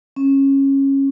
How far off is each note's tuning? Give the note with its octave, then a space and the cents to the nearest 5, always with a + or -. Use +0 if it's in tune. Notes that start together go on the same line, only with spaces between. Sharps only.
C#4 -20